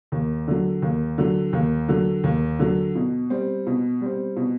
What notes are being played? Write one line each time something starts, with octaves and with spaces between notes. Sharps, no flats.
D#2
D3 F#3
D#2
D3 F#3
D#2
D3 F#3
D#2
D3 F#3
B2
G3 C4
B2
G3 C4
B2